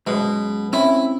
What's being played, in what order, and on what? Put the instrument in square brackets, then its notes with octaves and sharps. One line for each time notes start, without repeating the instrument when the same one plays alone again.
[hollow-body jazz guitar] F#2 G#3 [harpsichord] B2
[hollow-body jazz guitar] C4 C#4 B5 [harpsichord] E4